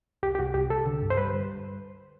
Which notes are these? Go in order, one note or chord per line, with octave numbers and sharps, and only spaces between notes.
C2 G4
G4
C2 F#4
C2 G4
C2 A4
D3
G2
C5
G3 B4